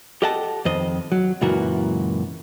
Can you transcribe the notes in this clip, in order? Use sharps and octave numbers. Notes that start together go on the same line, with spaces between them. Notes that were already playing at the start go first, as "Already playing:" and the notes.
G4 A4 D#5 F#5 G5 A5
F2 D#3 C5 D#5
F#3
C#2 F#2 A#2 E3 F#4 A#4